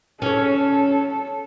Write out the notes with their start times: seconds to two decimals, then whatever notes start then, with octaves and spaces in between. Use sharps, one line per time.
0.22 C#4 A4 C#5